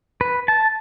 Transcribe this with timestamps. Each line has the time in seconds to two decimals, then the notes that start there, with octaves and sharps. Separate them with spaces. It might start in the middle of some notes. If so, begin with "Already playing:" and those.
0.21 B4
0.48 A5